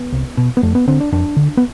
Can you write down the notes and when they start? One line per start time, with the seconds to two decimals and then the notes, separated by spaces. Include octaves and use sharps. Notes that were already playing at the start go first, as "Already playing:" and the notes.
Already playing: B3
0.12 C2
0.37 B2
0.57 B3
0.63 F2 A3
0.75 B3
0.88 D3 C4
1.00 D4
1.12 F2 D4
1.37 D3
1.57 B3